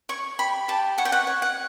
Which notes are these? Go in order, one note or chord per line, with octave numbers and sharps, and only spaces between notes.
C#5 C#6
G4 B5
G4 A5
C#5 F#5
G5
F#5
C#5
F#5